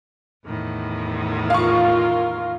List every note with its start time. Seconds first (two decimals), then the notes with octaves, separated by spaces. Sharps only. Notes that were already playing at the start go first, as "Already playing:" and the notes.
0.45 E2 A2 D#3
1.50 F4 A#4 F5 C#6